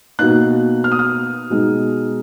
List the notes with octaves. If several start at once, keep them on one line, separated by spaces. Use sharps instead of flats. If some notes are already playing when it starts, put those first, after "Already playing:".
B2 A#3 D#4 F#6
F6
D#6
F6
B2 G#3 D#4